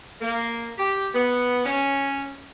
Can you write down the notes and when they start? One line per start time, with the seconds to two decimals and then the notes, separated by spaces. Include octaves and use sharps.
0.21 A#3
0.78 G4
1.14 B3
1.65 C#4